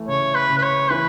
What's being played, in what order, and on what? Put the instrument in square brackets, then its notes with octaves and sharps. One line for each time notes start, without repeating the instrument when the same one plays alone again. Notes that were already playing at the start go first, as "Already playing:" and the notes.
Already playing: [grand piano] E3 A3
[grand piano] C#3 [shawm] C#5
[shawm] B4
[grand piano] C#3
[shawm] B4
C#5
[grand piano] E3 [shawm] B4